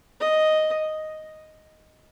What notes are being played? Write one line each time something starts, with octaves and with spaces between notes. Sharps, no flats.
D#5